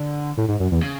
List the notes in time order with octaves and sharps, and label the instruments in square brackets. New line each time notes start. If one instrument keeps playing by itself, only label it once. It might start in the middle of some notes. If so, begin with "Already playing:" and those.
Already playing: [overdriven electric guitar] D3
[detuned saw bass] A2
G#2
F#2
E2
[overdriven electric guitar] C#3